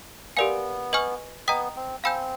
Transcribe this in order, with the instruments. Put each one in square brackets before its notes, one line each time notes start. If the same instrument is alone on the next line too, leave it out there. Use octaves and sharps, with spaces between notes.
[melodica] B3 [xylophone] G4 A#4 D5 F5 G#5
[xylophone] B4 D#5 G#5 C#6 F6
[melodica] B3 [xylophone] D#5 G5 A#5 D#6
[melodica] C4
[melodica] C4 [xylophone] F5 G#5 B5 E6 G6